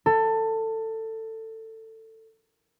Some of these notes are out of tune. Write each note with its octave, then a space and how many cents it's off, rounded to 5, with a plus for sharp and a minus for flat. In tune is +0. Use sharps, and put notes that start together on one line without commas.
A4 +20